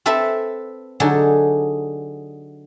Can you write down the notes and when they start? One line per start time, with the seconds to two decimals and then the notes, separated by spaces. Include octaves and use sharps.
0.06 C4 A4 B4 E5
1.00 D3 F#3 D#4 G#4 A4